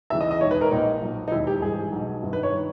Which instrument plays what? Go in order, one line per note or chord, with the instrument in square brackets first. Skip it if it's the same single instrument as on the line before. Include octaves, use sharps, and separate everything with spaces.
[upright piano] D#2 C#3 E3 E5
D#5
D#5
E1 D#2 D#3 C#5
B4
A#4
A#1 A#2 D#4
B1 A#2
D#4
E1 D#2 D#3 E4
G4
G#1 G2 E3 G#4
B1 B2
G1 G2 D#3
B4
C#5
D#3